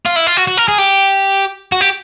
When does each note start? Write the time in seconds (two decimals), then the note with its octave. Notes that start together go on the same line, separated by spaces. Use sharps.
0.05 F4
0.16 E4
0.27 F4
0.37 F#4
0.48 F#4
0.57 A#4
0.68 G#4
0.78 G4
1.72 F#4
1.81 G4